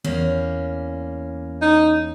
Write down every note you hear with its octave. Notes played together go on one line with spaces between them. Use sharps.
E2 A#3 C#4
D#4